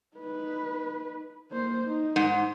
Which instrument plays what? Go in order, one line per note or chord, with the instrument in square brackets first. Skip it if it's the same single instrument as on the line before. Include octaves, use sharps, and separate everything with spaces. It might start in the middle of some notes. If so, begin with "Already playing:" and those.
[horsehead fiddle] D#4 B4
A#3 C5
D#4
[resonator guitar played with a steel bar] G#2